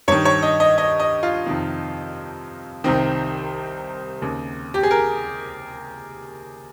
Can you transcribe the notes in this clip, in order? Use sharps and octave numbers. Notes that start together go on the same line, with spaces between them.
G2 D#3 C#5
C#5
D#5
D#5
D#5
D#5
F4
F2 C3 D#3
C2 C3 D#3 C4
D#2 C#3
G4
G#4
A#4